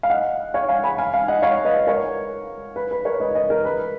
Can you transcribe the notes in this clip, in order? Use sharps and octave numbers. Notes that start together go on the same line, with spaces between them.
F5
D#5 F#5
C#5 F5
F5 G#5
G#5 B5
F5 G#5
F5 G#5
D#5 F#5
C#5 F5
B4 D#5
A#4 C#5
B4
B4
A#4 C#5
B4 D#5
B4 D#5
A#4
B4